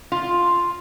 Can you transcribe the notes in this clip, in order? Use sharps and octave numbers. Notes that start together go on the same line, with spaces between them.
F4